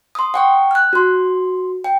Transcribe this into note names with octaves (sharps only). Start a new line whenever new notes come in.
C6 D#6
F#5 G5 C#6
F6 F#6
F#4 C6
G5